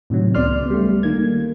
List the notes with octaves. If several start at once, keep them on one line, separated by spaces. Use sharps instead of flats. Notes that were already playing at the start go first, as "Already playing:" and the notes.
A2 C3 D#3 F#3
C#2 C#3 B3 D5 C6 F6
G3 A3
D#3 A#3 G#6